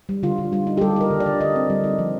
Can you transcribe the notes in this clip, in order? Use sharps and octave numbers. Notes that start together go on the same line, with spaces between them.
G3
D3 F4
D3
G3 F4
D#4
G4
G3 A4
D#4 A#4
D3
D5
D3
D3 D#5
C4
G3
D#4
F3